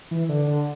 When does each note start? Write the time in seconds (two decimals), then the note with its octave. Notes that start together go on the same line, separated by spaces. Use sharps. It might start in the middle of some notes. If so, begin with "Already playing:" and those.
0.11 E3
0.29 D3
0.47 D3